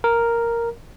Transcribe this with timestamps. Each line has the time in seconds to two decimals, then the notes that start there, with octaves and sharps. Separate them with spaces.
0.04 A#4